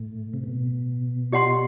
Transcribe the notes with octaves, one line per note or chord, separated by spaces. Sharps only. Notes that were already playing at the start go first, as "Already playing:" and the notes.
Already playing: A2
C3
B2
G4 D#5 F#5 C6